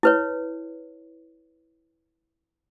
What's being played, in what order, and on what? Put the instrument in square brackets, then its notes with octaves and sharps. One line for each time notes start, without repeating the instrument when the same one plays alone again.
[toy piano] E4 B4 C#5